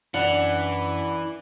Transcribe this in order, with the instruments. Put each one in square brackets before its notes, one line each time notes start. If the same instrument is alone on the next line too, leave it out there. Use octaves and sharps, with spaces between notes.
[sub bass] F#2 [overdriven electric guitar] E3 [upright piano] D4 [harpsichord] F#5